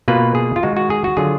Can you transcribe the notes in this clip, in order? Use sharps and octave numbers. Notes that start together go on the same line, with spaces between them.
B2 A#3 F4 B4
G#4
F4
D#3 G#3 D#4 F#4
F#4
G#4
F#4
D3 F#3 D4 F4 G#4